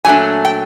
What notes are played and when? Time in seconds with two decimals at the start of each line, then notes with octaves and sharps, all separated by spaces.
0.05 A#2 F#3 A3 D4 G#5
0.45 G5